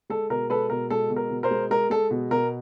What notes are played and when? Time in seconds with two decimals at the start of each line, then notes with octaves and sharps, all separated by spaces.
0.10 G#3 A4
0.30 B2 A#4
0.50 G#3 A4 B4
0.70 B2 A#4
0.90 G#3 A4
1.10 B2
1.16 A#4
1.30 B2
1.43 A#4 C5
1.51 G#3
1.71 G#3 A#4
1.90 G#3 A4
2.11 B2
2.31 B2 A#4